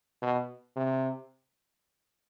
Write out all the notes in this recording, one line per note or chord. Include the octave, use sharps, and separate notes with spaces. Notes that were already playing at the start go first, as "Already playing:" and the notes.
B2
C3